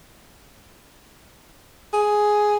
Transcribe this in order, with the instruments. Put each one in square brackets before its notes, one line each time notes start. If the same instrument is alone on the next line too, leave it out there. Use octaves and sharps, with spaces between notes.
[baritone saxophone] G#4